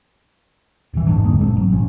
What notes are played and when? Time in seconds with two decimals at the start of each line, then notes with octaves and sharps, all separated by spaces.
0.94 D#1 G#1 E3
1.08 A1 F2 G#2 D4
1.24 D2 F#3 G#3 A#3
1.40 F#1 A#2 C4 D4
1.56 G#1 F#3
1.72 D#1 A#1 F3 C#4